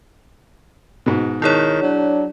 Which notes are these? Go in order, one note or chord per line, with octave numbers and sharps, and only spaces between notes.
G#2 B2
D#3 E4 G#4 C#5
F#3 D4